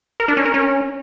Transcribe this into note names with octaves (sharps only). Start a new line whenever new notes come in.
A#4
D4
C#4
A#4
C#4